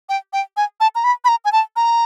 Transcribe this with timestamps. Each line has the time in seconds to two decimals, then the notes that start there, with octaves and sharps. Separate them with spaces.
0.09 G5
0.33 G5
0.57 G#5
0.80 A5
0.95 A#5
1.04 B5
1.25 B5
1.28 A#5
1.45 G#5
1.52 A5
1.76 A#5